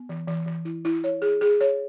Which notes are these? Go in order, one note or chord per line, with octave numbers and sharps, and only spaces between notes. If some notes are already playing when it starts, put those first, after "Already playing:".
Already playing: B3
E3
E3
E3
E4
E4
C#5
G#4
G#4
C#5